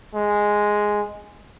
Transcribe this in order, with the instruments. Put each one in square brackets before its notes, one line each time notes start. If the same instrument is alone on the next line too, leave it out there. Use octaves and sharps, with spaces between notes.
[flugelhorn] G#3